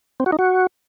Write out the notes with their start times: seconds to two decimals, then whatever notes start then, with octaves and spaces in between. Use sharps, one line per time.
0.20 C4
0.26 F#4
0.32 D#4
0.39 F#4